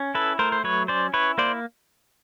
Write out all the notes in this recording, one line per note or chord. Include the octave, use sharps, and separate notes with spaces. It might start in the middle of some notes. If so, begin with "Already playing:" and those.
Already playing: C#4
E4 A4 B4
A3 A#4 C5
C5
F#3 B4 C#5
C#4 C5 D5
E4 B4 C#5
A#3 C5 D5